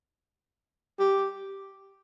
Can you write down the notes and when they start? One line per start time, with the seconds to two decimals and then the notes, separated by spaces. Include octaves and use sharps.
0.99 G4